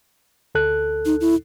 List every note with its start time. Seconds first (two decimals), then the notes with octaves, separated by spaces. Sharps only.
0.55 D2 A4 F#6
1.06 D#4
1.21 E4